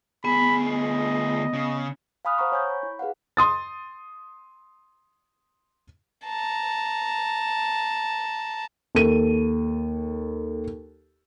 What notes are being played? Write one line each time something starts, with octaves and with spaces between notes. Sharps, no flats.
D2 B3 G#4 B5
D#5
C#3
F5 G#5 B5 D#6 F6 F#6
C5 F#5 A#5 C#6
C#5 G#5 C#6 G6 G#6
B5
E4
G#4 B4 F5 F#5
C6 D#6 A6
A5 A#5
D#2 A4 D#7